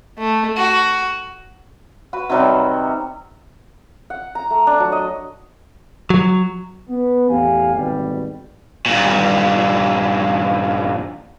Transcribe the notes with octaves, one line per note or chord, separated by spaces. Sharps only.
A3
F#4
F#4 B4
C3 D#3 F#3 G3
F#5
A#5
A3
D4
F#3
D#5
F#3
B3
E2 A2 G4 F5 G#5
G#1 D2 B2 G3
G2 A#2